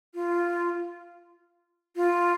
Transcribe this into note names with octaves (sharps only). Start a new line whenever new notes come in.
F4
F4